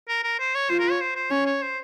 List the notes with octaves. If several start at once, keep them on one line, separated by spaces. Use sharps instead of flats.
A#4
A#4
C5
C#5
F4 C5
A#4
C#5
C5
C5
C#4 C#5
C#5
C5